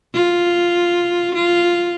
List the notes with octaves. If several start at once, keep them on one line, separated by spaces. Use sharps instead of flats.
F4
F4